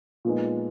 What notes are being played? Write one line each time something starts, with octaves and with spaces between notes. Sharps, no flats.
A#2 F3 G#3 B3 D#4